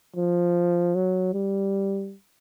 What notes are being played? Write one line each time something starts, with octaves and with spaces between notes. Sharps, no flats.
F3
F#3
G3